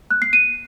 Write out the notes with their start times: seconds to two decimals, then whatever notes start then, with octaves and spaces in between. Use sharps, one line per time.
0.11 F#6
0.22 C7
0.33 D#7